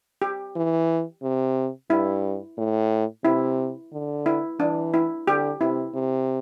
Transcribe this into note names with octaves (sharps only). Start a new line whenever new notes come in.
G4
E3
C3
G2 E4
A2
C3 E4
D3
E4
E3 D4
E4
D3 G4
C3 E4
C3